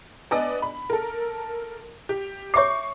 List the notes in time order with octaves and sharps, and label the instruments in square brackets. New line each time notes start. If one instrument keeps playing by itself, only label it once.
[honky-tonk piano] B3 D5 D#5 [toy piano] D4 A5 E6
[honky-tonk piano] B5
A4 A#4
G4
[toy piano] C#5 E5 D6 [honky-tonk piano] C#6 C7